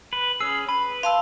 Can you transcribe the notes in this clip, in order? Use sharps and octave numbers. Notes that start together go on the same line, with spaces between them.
B4
C#4 G#4 E6
B4 B5
F5 A5 C6 E6